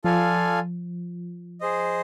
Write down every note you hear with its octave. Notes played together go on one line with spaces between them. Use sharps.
F3 F4 A4 D5 F5 G#5
G#4 C5 D#5